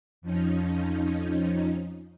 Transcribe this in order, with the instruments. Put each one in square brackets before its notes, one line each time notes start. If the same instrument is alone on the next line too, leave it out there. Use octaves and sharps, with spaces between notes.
[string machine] F2 F3 C#4 D#4